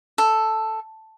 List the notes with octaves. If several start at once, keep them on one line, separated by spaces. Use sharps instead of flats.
A4